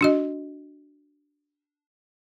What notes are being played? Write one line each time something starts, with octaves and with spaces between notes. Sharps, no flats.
D4 F#4 D#5